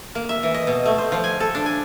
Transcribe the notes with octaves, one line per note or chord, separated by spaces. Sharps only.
A#3
E5
E3
D#5
B2
A3
C5
F3
G#5
A4
D4
G#5